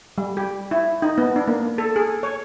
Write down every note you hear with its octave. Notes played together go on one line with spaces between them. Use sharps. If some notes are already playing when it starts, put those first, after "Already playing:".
G3
G4
E4
D#4
B3
D4
A#3
A4
G#4
C#5